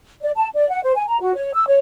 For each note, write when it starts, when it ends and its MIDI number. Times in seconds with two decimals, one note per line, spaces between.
0.21 0.30 74
0.36 0.48 81
0.55 0.68 74
0.70 0.81 78
0.83 0.93 72
0.96 1.04 80
1.08 1.20 82
1.20 1.34 66
1.34 1.50 73
1.54 1.65 88
1.67 1.79 73